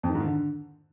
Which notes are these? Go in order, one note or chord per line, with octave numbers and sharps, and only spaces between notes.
F2
D#3
G#2
D#3
D3